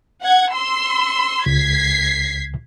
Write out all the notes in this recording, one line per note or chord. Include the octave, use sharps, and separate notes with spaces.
F#5 G#6
C6 E6
C#2 G#6 B6 C7